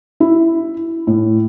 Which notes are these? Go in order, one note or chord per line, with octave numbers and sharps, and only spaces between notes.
E4
A2